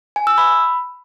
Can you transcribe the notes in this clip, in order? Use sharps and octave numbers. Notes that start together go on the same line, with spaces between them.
G#5
E6
B5